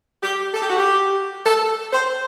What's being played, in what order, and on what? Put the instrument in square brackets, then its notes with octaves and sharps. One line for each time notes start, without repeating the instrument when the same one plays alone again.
[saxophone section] G4
A4
G4
F#4
G4
A4
C5